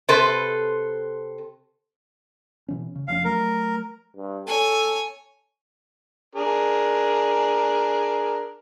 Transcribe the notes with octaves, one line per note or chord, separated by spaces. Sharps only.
C3 A4 B4 C5
B2 E3 C#4
C#3
F1 F3 C#4 F5
F#3 A3 A#4
G2
A4 C#5 G#5
D4 G#4 A#4